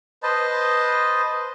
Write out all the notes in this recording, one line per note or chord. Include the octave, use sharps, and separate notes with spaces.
B4 C5 D#5 A5